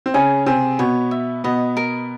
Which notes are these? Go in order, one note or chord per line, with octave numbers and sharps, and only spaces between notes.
C4
C#3 C#4 G#4
C3 C4 G#4
B2 B3 C#5
E5
B2 B3 D#5
A#4